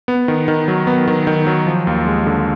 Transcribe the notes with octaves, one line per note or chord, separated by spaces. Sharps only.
B3
D#3
D#3
F#3
B3
D#3
D#3
F#3
F3
D#2
G#3
D3